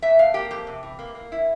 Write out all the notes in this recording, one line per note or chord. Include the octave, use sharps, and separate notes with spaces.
F2 E5
F2 F5
A#3 G4
F2 G4
C3
E3
A#3
A#3
E4